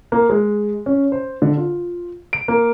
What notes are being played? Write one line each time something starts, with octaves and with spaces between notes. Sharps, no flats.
A#3
G#3
C#4
C5
D3
F4
D7
A#3